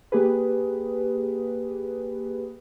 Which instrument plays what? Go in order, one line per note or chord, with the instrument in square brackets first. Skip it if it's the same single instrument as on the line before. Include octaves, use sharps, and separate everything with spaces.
[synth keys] A#3 G4 G#4 B4